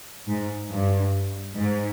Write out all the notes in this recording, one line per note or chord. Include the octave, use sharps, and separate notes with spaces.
G#2
G2
G#2